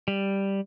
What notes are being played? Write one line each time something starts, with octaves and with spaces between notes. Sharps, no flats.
G3